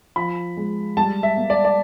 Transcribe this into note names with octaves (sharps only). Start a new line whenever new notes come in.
F3 B5
G#3
G3 A5
E5
A#3
D5
D5